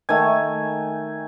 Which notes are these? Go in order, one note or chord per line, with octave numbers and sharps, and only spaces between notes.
D#3 A3 G#5